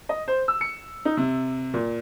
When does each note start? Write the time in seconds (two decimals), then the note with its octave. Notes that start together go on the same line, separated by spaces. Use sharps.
0.09 D#5
0.28 C5
0.48 E6
0.61 C#7
1.05 D#4
1.17 C3
1.74 A#2